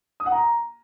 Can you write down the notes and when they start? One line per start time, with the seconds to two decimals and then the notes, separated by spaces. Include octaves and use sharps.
0.20 D#6
0.26 F#5
0.32 A#5